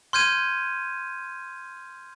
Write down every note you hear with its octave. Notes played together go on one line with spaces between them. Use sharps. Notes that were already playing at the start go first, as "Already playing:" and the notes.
C6 F6 G6 G#6 D#7